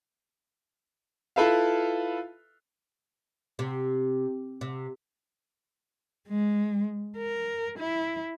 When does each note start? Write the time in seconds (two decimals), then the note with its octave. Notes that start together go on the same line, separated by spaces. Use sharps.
1.36 E4 F4 A4 B4 E5 F5
3.59 C3
4.61 C3
6.28 G#3
7.17 A#4
7.79 E4